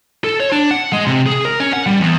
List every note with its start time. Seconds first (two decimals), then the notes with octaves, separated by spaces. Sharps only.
0.24 A4
0.40 C#5
0.52 D4
0.71 F#5
0.93 G#3
1.07 C3
1.26 G#4
1.45 A#4
1.60 C#4
1.73 F#5
1.86 G3
2.01 E2